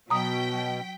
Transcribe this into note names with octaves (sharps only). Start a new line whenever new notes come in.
B2 F#3 G5 A#5 D#6 B6